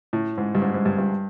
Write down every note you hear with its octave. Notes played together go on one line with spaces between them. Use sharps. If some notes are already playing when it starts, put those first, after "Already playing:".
A2
G#2
G2
G#2
G#2
G2
G2